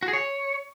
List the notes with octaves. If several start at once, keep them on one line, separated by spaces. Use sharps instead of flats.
F#4
G#4
C#5